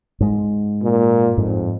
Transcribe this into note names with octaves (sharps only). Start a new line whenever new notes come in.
G#2 G#3
A#2
F2 G#2